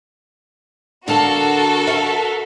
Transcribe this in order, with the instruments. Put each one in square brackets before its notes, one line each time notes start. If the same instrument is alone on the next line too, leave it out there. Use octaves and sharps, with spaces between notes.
[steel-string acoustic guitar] D3 F5 A5 [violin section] F#4 A4 A#4
[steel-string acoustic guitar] E5 F5